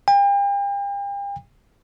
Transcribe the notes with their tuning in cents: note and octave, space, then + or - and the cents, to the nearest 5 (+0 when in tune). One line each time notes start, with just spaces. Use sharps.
G5 +40